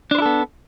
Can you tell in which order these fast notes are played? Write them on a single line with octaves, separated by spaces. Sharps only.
D4 C5 E4 A4 B3